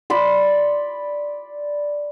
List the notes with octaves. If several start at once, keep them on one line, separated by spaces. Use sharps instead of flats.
D5 B5 C6